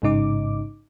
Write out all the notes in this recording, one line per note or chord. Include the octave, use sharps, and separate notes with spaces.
A1 G#2 C#3 D#4 D6